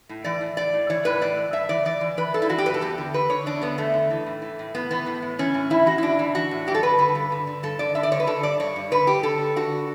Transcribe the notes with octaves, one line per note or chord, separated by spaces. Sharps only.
A2
E3 D5
A2
A2 D5
A2
E3 C#5
A2 B4
A2 D5
E3
G2 E5
E3 D5
E3 D5
E3
E3 B4
G2 A4
E4
E3 F#4
G4
G2 B4
A4
E2 G4
D3
D3 B4
D3 C#5
E2 D4
D3 B3
E2 A3
D3
E3
A2
E3
A2
A2 B3
E3 B3
A2
A2
E3 C#4
A2
E3 E4
E3 F#4
E4
A2 D4
E3
E3 F#4
A2
G2 G4
A4
D3 B4
D3 B4
G2
D3
D3
G2 A4
D3 D5
D3 E5
D5
D3 C#5
B4
D3 A4
G2 D5
G2 C#5
G2
D3 B4
G2 G4
D3 A4
D3
D3 F#4